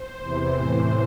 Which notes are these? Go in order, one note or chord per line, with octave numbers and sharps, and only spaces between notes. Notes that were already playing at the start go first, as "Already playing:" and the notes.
Already playing: C5
E2 C3 E3
A2 E3